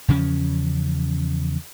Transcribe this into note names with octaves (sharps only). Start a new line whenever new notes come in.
E2 C#3 F3 C#4